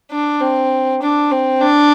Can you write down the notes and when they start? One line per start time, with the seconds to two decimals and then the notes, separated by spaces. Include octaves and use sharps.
0.11 D4
0.41 C4
1.02 D4
1.31 C4
1.61 D4